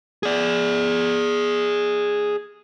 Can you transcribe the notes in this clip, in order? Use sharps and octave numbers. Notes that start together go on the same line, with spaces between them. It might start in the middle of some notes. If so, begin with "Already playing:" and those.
G#4 D5